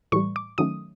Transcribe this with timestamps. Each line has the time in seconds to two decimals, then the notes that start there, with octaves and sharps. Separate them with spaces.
0.12 A2 E3 G3 C#6
0.36 D6
0.58 D#3 F#3 A3 C#4 D#6